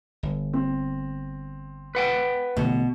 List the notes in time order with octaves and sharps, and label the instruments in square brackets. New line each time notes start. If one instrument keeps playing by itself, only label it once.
[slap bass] G1
[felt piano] C4
[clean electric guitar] B4 F#5 G5
[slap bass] A1 D3 A3 [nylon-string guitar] B2